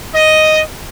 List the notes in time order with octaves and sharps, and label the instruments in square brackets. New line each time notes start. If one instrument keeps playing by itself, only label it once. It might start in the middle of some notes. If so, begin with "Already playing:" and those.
[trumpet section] D#5